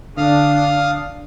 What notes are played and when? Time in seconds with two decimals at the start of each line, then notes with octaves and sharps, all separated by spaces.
0.17 D3 D4 F5 D#6 F6